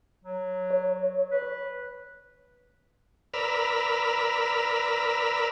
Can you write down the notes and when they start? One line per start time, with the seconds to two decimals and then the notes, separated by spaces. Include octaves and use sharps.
0.24 F#3
0.70 C#5
1.32 B4
3.34 A#4 B4 D5 B5 E6 F6